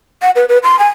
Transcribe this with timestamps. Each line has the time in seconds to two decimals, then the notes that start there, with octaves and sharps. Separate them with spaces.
0.22 F#5
0.36 B4
0.49 B4
0.63 C6
0.79 G#5